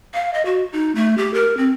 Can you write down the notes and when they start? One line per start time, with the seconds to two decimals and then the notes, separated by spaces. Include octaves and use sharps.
0.14 F5
0.34 D#5
0.45 F#4
0.73 D#4
0.95 A3
1.18 G4
1.34 A#4
1.57 C4